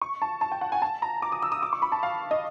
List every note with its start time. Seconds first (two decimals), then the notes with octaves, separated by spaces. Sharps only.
0.02 C#6
0.22 A5
0.41 A5
0.52 G5
0.61 F#5
0.72 G#5
0.82 A5
1.02 A#5
1.22 D6
1.32 D#6
1.42 E6
1.52 D#6
1.63 D6
1.73 C#6
1.82 B5
1.92 A5
2.03 F5
2.31 D#5